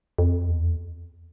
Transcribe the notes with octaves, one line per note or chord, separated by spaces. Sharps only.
F2
E2